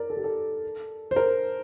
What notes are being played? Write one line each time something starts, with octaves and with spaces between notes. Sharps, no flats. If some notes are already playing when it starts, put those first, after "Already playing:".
Already playing: A#4 D5
A4
G4
A4
C5
A#4